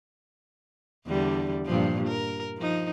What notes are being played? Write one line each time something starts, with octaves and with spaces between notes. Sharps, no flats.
E2 D3 G3
G2 A#2 F3
A#4
F3 D#4